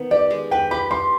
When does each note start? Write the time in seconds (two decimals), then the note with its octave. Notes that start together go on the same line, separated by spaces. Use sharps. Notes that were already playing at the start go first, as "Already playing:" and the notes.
Already playing: D#3 B3
0.11 G4 D5
0.31 G#3
0.51 B4 G5
0.71 G4 B5
0.91 G4 C6